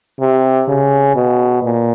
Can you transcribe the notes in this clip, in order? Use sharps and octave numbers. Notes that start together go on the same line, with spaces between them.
C3
C#3
B2
A#2